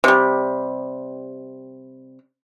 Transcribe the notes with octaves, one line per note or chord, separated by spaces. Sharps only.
C3 G3